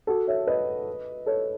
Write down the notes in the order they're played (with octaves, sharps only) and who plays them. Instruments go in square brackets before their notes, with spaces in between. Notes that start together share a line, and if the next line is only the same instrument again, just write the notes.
[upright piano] F#4 A4
C#5 E5
B4 D#5
A4 C#5